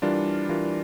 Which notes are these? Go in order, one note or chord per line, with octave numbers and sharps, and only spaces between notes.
E3 G3 D4 F4 A#4
E3 G3 D4 F4 A#4